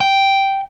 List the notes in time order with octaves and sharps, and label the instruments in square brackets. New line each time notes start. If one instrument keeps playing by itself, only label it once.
[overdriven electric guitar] G5